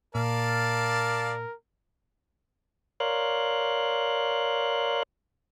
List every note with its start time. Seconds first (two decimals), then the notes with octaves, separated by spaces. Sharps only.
0.15 A#2 A#4 D5 F5 A5
3.00 A#4 C#5 D5 F5 C6 F#6